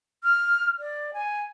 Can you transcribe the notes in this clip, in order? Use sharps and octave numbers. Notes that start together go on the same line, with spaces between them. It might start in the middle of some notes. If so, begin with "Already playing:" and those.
F6
D5
G#5